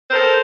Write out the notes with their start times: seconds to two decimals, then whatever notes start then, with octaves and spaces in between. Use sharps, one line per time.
0.09 C5
0.12 A#4
0.14 A4